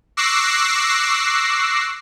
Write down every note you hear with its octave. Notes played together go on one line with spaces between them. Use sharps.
C#6 D6 E6 F#6 A#6 C7